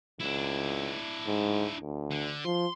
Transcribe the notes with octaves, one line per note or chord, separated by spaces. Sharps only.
C#2 D4 E4
G#2
D2
D3
F3 C6